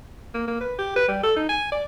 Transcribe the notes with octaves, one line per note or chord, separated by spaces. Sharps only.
A#3
A#3
B4
G4
B4
G3
A4
D#4
G#5
D5